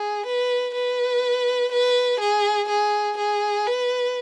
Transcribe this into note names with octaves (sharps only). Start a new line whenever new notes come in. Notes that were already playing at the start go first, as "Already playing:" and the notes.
Already playing: G#4
B4
B4
B4
G#4
G#4
G#4
B4